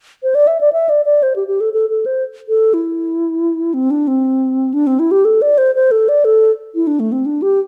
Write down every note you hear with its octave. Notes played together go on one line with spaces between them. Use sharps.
C5
D5
E5
D5
E5
D5
D5
C5
G4
G4
A4
A4
A4
C5
A4
E4
C4
D4
C4
D4
C4
E4
G4
A4
D5
C5
C5
A4
D5
A4
E4
D4
A3
C4
D4
G4